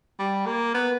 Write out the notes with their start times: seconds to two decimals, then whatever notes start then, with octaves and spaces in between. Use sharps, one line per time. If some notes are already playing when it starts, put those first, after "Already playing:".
0.19 G3
0.46 A#3
0.74 B3